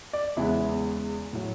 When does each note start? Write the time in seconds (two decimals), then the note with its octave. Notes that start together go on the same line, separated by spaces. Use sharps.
0.13 D5
0.37 E2 C#3 G#3 B3 E4
1.33 A2 F#3